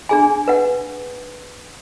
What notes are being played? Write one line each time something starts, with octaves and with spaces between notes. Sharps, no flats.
D4 G#4 G#5
B4 F#5